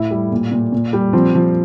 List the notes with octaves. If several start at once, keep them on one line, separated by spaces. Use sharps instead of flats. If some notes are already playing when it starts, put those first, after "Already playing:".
Already playing: A2 E4
G3
A#2
A#2
A#2
G3
F3 C4
F3